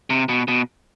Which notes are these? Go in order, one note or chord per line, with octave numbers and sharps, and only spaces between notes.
C3
B2
B2